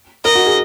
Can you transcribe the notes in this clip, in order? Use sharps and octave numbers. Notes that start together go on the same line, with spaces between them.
A#4 D#5
F#4
G#4